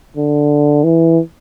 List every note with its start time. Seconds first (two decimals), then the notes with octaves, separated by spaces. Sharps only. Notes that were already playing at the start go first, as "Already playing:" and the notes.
0.17 D3
0.84 E3